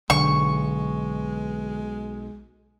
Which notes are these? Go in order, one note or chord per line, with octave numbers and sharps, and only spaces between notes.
B1 D3 G#3 C#6